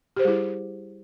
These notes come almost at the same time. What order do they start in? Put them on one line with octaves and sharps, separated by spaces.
G4 C5 G#4 G3 E4